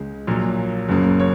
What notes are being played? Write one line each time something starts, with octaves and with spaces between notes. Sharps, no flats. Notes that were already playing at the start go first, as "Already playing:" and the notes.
Already playing: C#2 C#3 G#3
A#1 A#2 F#3 A#3
F#1 F#2 C#3 A#3
C#5